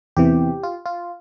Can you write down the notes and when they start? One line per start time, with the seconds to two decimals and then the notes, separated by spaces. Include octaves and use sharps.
0.17 E2 C3 E3 G4
0.63 F4
0.86 F4